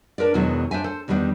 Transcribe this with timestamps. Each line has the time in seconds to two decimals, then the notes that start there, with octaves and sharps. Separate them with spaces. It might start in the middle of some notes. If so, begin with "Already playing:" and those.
0.18 D4 A#4 B4 D5
0.34 E2 B2 D#3 E3 F#3 G#3
0.71 D4 C5 E5 G#5
0.84 A4 C5
1.08 E2 D#3 G3 B3 D4